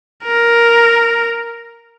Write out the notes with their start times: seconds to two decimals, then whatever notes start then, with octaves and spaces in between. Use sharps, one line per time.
0.25 A#4